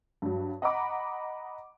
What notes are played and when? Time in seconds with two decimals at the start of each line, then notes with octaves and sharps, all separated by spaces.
0.22 G2 F#3
0.62 D#5 F#5 A#5 B5 D6